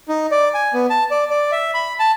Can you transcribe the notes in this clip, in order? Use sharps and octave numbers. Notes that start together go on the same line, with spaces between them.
D#4
D5
G#5
B3
A5
D5
D5
E5
B5
A5